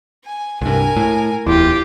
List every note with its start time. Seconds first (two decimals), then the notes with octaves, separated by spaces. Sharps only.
0.25 G#5
0.61 C2 G2 A#4 G#5
0.97 A2
1.47 D1 E2 E4 F4 G4